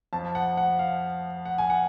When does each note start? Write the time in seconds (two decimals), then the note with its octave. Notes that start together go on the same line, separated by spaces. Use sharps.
0.13 F2 F3 A5
0.35 F#5
0.57 F#5
0.79 F5
1.45 F#5
1.58 G#5
1.70 F#5